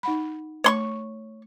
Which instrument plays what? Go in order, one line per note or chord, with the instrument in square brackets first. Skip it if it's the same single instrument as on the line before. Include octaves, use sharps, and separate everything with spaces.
[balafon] D#4 F#5 B5
[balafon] A3 [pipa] C#5 C6 C#6